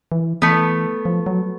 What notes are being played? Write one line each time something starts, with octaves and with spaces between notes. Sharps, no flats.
E3
E3 A3 B3
F3
F#3